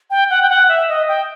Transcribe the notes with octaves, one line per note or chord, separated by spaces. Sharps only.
G5
F#5
G5
F#5
E5
D#5
G5